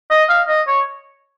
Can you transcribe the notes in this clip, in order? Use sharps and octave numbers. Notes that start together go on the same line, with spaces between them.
D#5
F5
D#5
C#5